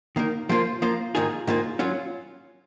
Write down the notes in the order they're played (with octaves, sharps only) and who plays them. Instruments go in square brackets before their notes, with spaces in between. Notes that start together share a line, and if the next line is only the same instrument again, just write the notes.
[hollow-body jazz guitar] D#3 A#3 D#4 A#4
F3 A#3 F4 C5
F3 A#3 F4 C5
G#2 D#3 A#3 F4 G#4
G#2 D#3 A#3 F4 G#4
F#3 C#4 F4